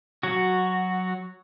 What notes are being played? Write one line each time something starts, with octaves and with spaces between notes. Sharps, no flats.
F#3 F#4